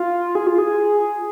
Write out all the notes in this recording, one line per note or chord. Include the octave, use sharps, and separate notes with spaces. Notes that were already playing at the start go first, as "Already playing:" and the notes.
Already playing: F4
G#4
F4
G#4